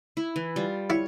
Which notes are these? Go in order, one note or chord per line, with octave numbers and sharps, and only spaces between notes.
E4
E3
G3 F4
E4 C#5